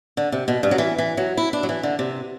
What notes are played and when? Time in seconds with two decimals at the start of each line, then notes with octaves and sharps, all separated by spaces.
0.17 D3
0.32 C3
0.48 B2
0.63 G2
0.71 F#3
0.78 E3
0.98 E3
1.17 F#3
1.37 E4
1.53 D4
1.63 F#3
1.69 E3
1.83 D3
1.99 C3